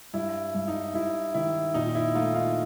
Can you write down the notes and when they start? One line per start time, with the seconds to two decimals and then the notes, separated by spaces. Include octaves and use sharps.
0.14 G2 E4
0.55 G2
0.68 D#4
0.94 G2 E4
1.34 D#3 E4
1.74 A#2 D#4
1.95 E4
2.15 A3 D#4 F4
2.34 D#4 F4